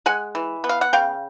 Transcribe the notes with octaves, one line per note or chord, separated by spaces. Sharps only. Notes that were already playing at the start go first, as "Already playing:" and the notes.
G#3 F#5 G#5
E3
B3
F5
F#5
C#3 F5 G5